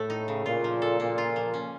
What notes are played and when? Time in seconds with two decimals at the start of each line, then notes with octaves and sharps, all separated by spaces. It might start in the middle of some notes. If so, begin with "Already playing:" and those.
Already playing: A2 A3 A4
0.10 D#4
0.28 C#3
0.46 A#2 F4
0.64 F3
0.82 A4
1.00 A#2 A#3
1.18 F4
1.36 F3
1.54 C#4